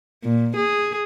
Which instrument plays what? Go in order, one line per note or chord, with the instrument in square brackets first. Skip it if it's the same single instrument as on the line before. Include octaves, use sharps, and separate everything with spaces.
[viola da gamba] A#2
G#4